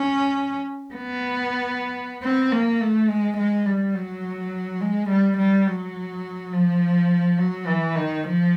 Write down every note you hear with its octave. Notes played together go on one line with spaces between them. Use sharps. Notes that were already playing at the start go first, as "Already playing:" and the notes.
Already playing: C#4
B3
C4
A#3
A3
G#3
G#3
G3
F#3
G#3
G3
G3
F#3
F3
F#3
E3
D#3
F3